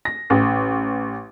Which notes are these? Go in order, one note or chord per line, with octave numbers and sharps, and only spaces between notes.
A#6
A1